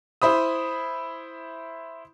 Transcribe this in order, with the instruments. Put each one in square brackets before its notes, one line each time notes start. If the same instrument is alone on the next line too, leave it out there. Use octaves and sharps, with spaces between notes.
[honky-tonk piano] E4 C5 B5 D#6